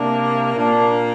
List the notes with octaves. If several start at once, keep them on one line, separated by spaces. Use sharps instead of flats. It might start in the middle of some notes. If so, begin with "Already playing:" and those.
Already playing: C3 A#3 D4
A#2 A#3 D4